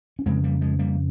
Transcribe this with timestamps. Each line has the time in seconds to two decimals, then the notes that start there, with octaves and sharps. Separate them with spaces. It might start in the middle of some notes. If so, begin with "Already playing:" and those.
0.19 C#4
0.26 F2 C#3 G#3 C4
0.44 G3 A#3
0.61 F3 G#3
0.79 G3 A#3